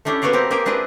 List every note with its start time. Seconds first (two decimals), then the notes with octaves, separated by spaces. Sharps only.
0.05 A3 C#4 D4 E4 G4
0.22 A#3 B3 F#4 C#5 D5 F5
0.33 C4 G4 A#4
0.51 A#3 G4 G#4 A#4 G5
0.65 C4 D4 E4 G#4 B4 D5